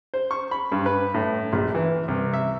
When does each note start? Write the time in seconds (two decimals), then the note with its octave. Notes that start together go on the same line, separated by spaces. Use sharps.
0.14 C5
0.31 C#6
0.51 B5
0.72 G2
0.86 B4
1.14 A2
1.53 A#1
1.75 E3
2.08 C2
2.34 E5